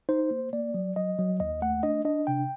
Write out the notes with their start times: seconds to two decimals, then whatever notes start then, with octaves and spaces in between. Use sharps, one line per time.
0.09 D#4 C5
0.31 A#3
0.53 A#3 D5
0.74 F#3
0.96 F#3 D#5
1.19 F#3
1.40 D#2 D#5
1.62 A3 F#5
1.83 D4 D#5
2.05 D4 D#5
2.27 C3 G5